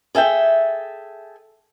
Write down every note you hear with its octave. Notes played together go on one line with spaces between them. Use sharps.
G#4 A4 E5 G5